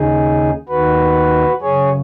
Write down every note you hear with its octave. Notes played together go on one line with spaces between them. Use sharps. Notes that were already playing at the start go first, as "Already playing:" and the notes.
Already playing: D#2 C#3 D#4 G#4
D#2 D#3 F#4 B4
F#2 C#3 G#4 C#5